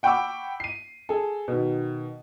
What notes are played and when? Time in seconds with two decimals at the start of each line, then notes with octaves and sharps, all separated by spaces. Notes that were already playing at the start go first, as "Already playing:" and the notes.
0.03 F#5 G5 B5 C#6 D6 E6
0.60 C7 D#7
1.09 G#4 A4
1.48 B2 D#3